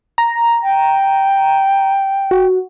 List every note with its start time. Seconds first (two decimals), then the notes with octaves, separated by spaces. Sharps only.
0.18 A#5
0.63 G5
2.31 F#4